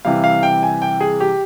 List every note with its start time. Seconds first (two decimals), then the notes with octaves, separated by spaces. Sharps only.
0.05 C3 E3 G3 F5
0.24 F5
0.43 G5
0.63 G#5
0.82 G5
1.01 G#4
1.20 G4